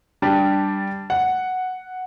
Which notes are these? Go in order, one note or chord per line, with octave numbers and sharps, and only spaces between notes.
G3 D4 G4
F#5